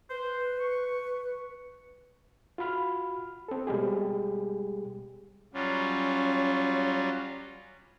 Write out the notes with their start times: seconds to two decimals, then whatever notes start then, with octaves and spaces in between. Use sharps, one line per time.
0.10 B4 C5
0.59 C#6
2.58 F4 F#4 B5 F6
3.48 C4 A4
3.67 B2 G3 G#3 G4 G#4
5.54 F#3 G3 C#4 F4